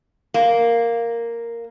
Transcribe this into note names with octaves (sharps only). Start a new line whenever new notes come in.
A#3